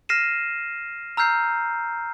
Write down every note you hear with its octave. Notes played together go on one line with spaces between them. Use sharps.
F6 A#6 C7 D#7 E7
A#5 E6 F6 G6 C7